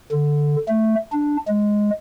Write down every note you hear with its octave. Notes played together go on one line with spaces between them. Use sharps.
D3
A3
D4
G#3